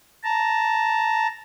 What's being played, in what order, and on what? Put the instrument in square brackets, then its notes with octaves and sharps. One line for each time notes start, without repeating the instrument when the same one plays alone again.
[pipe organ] A5 A#5